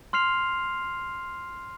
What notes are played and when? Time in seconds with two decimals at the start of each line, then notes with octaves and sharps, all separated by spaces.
0.13 C6 F6 C7 F7